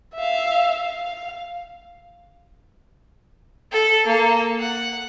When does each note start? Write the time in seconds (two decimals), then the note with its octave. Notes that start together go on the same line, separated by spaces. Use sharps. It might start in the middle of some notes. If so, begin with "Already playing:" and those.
0.15 E5 F5
0.76 F5
3.72 A4
4.06 A#3 A4
4.59 F#5